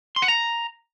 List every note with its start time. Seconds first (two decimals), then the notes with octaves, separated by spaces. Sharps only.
0.16 C6
0.22 F#5
0.28 A#5